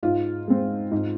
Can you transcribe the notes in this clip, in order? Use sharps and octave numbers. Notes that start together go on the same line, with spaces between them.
G#2 F4
G#3 C4
G#2